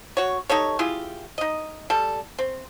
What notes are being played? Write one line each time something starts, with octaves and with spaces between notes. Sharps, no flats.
F#4 C#5
D#4 G4 A4 C#5
E4 F4 G4 G#4
D#4 D#5
G3 A4
C4